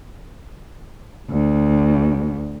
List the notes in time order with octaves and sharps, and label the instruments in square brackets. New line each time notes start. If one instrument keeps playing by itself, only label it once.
[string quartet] D2